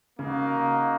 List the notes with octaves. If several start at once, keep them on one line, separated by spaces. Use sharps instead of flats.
C#3 A#3 D#4 F#4